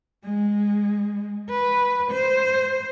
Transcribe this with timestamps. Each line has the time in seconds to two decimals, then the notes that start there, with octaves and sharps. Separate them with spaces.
0.24 G#3
1.49 B4
2.11 C5